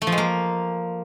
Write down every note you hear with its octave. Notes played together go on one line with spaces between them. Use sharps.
A3
F3
G#3
A#3